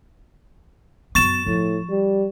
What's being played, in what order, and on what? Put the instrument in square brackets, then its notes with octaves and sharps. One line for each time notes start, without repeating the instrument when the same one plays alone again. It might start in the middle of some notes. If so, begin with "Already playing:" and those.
[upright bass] F#2 B3 [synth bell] C#6 A6 E7
[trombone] A2 [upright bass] F3
[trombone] G3